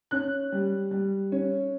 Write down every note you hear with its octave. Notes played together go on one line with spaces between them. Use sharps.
C#4 F#6
G3
G3
C#4